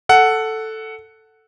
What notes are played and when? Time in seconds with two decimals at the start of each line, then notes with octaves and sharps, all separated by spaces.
0.09 A4 F#5